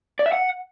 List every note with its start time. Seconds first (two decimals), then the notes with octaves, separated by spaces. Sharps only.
0.19 D5
0.26 E5
0.32 F#5